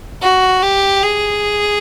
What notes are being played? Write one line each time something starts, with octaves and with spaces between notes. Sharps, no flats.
F#4
G4
G#4